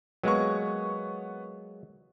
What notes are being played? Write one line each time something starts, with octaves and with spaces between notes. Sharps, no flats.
F#3 G#3 A#3 B3 C#6